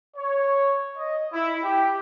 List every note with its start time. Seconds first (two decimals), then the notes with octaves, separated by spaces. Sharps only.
0.17 C#5
0.97 D#5
1.33 E4
1.63 G4